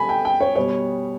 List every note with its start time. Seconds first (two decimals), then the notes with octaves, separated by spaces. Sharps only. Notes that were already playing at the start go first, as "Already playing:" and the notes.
Already playing: B2 G3 G#5 B5
0.09 G5
0.25 G5
0.40 C#5
0.56 B2 G3 C#5